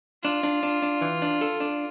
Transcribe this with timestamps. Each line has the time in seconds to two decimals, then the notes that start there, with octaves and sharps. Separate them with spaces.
0.24 D4 F4
0.43 D4
0.63 D4
0.82 D4
1.01 E3
1.22 D4
1.41 A4
1.60 D4